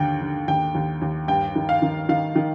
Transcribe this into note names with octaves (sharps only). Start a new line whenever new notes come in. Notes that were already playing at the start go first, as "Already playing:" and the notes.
Already playing: D#2 D3 G5
D3
D#2 G5
D#2
D#2
G2 G5
D#3
F5
D#3
D#3 F5
D#3